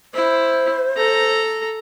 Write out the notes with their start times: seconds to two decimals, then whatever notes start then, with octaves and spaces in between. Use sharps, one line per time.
0.14 E4 C5
0.97 A4 A#5